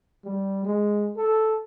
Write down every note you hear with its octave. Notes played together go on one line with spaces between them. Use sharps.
G3
G#3
A4